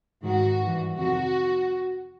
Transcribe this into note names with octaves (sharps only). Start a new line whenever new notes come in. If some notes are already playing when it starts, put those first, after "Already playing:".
G#2 D#3 F#4
G2 E3
F2 C3 D#3 F#4